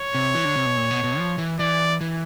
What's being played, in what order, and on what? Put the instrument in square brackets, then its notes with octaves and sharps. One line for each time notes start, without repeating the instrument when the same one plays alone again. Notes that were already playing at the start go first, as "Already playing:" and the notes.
Already playing: [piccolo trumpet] C#5
[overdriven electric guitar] C3
E3
D3
C3
B2
A#2
B2
B2
F3
E3
[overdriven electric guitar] E3 [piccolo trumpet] D5
[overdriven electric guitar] E3